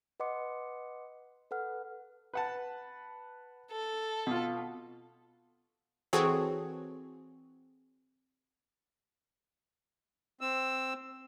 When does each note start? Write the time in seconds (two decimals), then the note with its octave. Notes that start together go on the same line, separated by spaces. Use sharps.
0.20 B4 D#5 F#5 C6 D6 C#7
1.51 A4 B4 F#5 F6
2.34 B4 F#5 A5
3.71 A4
4.27 B2 F4
6.13 E3 C4 F#4 G#4 A4 C#5
10.41 C4 E6